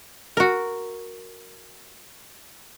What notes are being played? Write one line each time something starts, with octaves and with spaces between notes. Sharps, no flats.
F#4 A#4